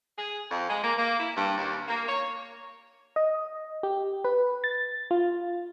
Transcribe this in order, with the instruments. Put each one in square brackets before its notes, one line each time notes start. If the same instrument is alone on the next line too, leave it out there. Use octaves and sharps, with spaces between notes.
[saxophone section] G#4
F2
G#3
A#3
A#3
E4
G2
D#2
A#3
C#5
[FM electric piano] D#5
G4
B4
A6
F4